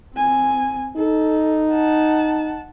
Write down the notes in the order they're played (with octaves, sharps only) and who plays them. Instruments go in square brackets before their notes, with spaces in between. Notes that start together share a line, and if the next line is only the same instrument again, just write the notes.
[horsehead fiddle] C4 G#5
[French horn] D#4 [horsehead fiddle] A4
[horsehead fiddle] F#5 A5